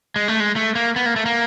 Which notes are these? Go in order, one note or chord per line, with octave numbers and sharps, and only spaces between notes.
G#3
A3
G#3
A3
A#3
B3
A#3
A3
A#3